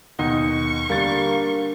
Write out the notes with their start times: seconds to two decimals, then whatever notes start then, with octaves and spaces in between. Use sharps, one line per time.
0.19 D#2 B2 D#4 F#5 C#6
0.90 D3 G3 A#3 A6